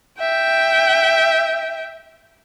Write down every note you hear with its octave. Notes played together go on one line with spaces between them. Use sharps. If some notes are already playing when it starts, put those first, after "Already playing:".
E5 G5